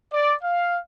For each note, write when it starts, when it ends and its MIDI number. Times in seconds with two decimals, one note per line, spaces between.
0.13 0.35 74
0.43 0.78 77